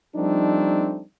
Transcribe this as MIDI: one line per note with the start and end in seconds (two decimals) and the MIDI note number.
0.15 1.01 53
0.15 1.01 55
0.15 1.01 57
0.15 1.01 60
0.15 1.01 62
0.15 1.01 63